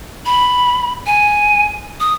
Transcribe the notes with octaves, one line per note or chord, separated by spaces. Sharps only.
B5
G#5
D#6